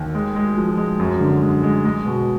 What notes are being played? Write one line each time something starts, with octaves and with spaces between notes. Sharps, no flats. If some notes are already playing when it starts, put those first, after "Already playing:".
Already playing: D#2
G#3
G#3
F3
G#3
F#2
D3
G#3
G#3
G#3
B2